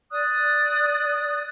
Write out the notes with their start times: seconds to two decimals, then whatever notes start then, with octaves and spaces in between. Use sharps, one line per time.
0.11 D5 D#6 F#6